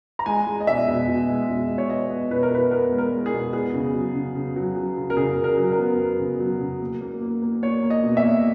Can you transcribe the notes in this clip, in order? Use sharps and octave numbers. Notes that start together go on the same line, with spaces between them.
A#5
G#3 G#5
G#3
D#5
B2 E5
B2
B2
G#3
B2
G#3
C#5
B3 D#5
B3
B2 B4
A#4
B2 B4
B3 A#4
G#3
A#4
G#3
G#4
B2
B3 G#4
C#3
F#3
C#3
C#3
F#3
F#3
C#3
A#4
C#3 G#4
C#3
A#4
F#3
A#4
B3
B3
C#3
F#3
C#3
A#3
A#3
A#3
A#3
A#3 C#5
A#3
D#5
B2
E5
A#3